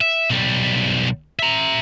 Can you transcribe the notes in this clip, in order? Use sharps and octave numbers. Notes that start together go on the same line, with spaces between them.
E5
B1 G3
E5 A#5